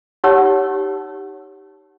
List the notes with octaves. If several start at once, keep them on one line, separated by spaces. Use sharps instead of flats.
D#4 G4 C#5 F#5 E6